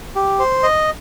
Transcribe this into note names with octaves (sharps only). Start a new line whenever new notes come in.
G4
C5
D#5